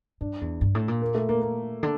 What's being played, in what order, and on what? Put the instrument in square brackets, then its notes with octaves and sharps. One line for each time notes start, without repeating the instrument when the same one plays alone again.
[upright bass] G2 [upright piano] D4
[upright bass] E2
G2
A2
A#2
[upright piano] A#3
A3
A#3
A#3
[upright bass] D3